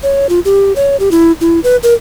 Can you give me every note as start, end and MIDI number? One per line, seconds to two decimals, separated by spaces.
0.03 0.27 73
0.29 0.40 65
0.45 0.73 67
0.76 0.96 73
1.00 1.09 67
1.11 1.32 64
1.41 1.60 64
1.64 1.76 71
1.83 1.94 70